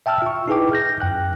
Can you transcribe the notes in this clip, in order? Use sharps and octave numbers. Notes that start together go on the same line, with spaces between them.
E5 G5 A5 E6 F6
F4 C#6
D#4 E4 G#4 B4 G5 D6
F6 G6 A#6
F#2 G5 F#6